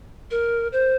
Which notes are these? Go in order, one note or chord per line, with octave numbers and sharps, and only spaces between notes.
A#4
C5